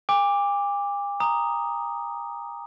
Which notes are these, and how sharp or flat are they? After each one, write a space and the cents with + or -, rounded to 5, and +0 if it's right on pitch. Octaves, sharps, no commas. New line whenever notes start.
G#5 -45 D6 +0
A#5 +0 D#6 +0